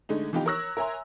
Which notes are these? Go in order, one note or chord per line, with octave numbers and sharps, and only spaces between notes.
D3 G#3 A3 D#4
E3 F3 B3 D#4 F4 G4
A#4 C#5 C#6 E6 F#6 A#6
A#4 C#5 E5 G#5 A#5 C6